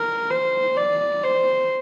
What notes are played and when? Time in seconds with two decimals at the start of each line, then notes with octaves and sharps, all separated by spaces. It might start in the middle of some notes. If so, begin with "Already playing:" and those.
Already playing: A#4
0.31 C5
0.77 D5
1.24 C5